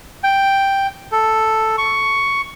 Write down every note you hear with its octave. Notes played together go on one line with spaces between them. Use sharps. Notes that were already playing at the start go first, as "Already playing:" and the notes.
G5
A4
C#6